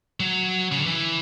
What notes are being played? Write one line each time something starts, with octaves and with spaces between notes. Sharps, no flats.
F#3
C#3
D3
E3